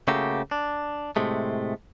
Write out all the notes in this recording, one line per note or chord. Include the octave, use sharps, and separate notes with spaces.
C#3 A3 A#3 F#4 G4
D4
A2 C3 G#3 A3